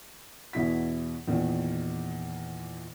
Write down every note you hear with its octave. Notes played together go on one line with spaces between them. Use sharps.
E2 B2 E4 B6
E2 A#2 D#3